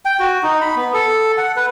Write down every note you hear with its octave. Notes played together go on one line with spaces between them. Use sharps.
G5
F#4
D#4
B5
B3
A4
F#5
B4